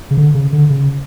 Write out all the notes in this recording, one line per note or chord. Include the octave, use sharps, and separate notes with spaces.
C#3
D3
C#3
D3
C#3